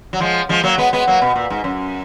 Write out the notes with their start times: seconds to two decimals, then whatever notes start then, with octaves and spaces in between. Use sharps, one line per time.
0.13 F#3
0.20 F3 G#3
0.49 F3 G#3
0.63 F#3 A#3
0.78 G#3 B3
0.93 G#3 B3
1.07 F#3 A#3
1.22 B2
1.36 A#2
1.50 G#2
1.64 F#2